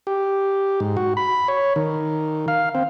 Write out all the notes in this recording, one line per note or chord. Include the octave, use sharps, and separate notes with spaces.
G4
G#2
F#4
B5
C#5
D#3
F5
C4